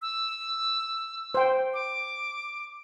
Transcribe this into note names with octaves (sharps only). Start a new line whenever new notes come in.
E6
C5 G5
D6